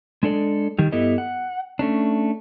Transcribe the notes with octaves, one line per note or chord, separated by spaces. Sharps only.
G#3 D4 A4 D5
D#3 G3
G2 B3 E4 G4 A4 D#5
F#5
A3 C#4 D4